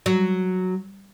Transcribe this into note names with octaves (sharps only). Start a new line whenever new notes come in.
F#3